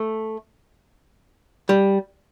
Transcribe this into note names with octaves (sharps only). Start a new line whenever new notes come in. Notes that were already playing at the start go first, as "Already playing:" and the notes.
Already playing: A3
G3